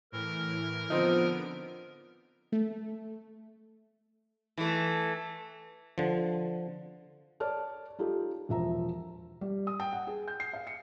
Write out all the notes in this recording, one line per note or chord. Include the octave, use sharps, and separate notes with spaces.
A2 E3 A#4
D3 F3 B3 C4 D#4 D7
A3
E3 A3
D3 F3
C#5 D5 A5 F6
D#4 F4 G4 A4
E1 F3 E5 A#5
G3
D#6
G5
F#5
G#4
G6
C7
F5
C#7